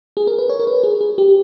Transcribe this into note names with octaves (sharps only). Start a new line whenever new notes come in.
G#4
A#4
B4
C#5
A#4
B4
G#4
G#4
G4